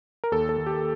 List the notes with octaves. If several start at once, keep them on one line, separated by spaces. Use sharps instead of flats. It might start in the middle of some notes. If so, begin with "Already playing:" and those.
A#4
D#2 A4
A4
D#2
G4